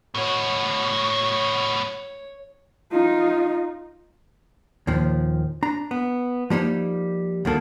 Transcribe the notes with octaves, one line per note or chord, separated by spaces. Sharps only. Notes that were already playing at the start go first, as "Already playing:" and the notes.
A2 F#4 C#5
D#4 F4
D#2 A#2 D#3 F3
D4 A#5
B3
F3 G3 A#3 D#4
D2 D#3 A#3 A4